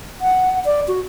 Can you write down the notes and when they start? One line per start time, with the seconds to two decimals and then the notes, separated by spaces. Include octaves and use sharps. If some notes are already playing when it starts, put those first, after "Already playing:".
0.21 F#5
0.65 D5
0.88 F#4